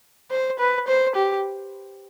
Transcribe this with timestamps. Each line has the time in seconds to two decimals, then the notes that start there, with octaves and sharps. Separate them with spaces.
0.31 C5
0.59 B4
0.88 C5
1.15 G4